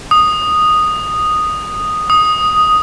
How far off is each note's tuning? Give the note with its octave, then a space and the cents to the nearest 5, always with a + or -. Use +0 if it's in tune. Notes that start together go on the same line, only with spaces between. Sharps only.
D#6 -10
D#6 +0